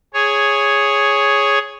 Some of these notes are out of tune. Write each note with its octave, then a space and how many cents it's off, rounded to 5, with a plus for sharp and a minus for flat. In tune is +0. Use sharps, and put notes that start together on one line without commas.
G#4 +0 C#5 +0